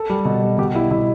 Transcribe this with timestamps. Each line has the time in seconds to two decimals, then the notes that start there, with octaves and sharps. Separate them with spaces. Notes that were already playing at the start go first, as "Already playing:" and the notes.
Already playing: A4
0.10 G3
0.25 B2
0.43 G3
0.58 B2 G4
0.75 G3 E4
0.91 B2 E4